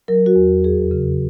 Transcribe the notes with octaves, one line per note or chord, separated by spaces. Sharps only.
F#3 A#4
F#4
E2
F2 G#4
C#3